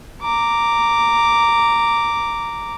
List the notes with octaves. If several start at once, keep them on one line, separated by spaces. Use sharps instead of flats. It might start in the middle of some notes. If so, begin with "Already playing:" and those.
A#5 D6